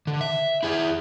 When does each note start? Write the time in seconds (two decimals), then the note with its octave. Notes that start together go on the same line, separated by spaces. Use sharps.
0.07 D3
0.21 E5
0.63 E4 G#4